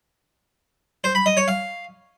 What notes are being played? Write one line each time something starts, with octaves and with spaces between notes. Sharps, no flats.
C5
B5
D#5
C#5
F5